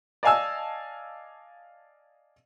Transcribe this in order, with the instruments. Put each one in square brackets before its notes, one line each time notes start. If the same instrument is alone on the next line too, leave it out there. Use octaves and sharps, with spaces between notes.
[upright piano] D5 D#5 F5 G#5 A5 E6